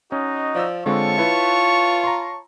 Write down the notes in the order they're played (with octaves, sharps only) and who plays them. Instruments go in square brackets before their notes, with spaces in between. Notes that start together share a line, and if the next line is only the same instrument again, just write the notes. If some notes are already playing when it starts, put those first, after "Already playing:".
[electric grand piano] C#4 [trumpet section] D#4 F#4 D#5
[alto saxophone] F3 [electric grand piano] D5 E6
[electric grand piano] D3 G#3 C4 [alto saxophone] F4 [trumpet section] C#5 A5 C#6
[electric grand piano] E4 B4 [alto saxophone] F4
[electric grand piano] A#5 C6